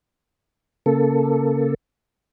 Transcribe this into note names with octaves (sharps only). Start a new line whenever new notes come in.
C#3 A#3 A4